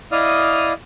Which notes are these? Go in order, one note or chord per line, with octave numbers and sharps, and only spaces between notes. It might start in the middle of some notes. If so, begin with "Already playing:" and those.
E4 D5 D#5 F5 D#6 F6